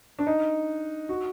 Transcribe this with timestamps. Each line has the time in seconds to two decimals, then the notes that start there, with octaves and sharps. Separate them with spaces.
0.19 D4
0.27 D#4
1.09 F#4